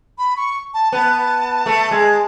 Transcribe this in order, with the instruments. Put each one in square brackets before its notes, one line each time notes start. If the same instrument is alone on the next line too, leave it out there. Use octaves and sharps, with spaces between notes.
[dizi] B5
C#6
A5
[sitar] B3 [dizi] A5
[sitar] A3
G#3